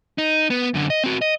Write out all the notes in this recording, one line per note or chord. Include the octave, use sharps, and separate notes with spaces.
D#4
B3
F#2 D3
D#5
C4 F#4
D#5